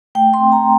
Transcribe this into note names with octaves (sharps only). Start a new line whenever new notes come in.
A3 G5
C6
C4
A#5